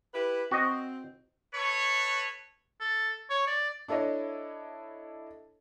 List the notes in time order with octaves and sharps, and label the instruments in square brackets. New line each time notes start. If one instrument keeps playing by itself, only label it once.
[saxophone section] E4 G4 B4
[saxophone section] C4 [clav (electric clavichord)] F#4 D#5
[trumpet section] A4 B4 C#5
[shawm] A4
C#5
D5
[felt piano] D4 E4 A4 C#5 D#5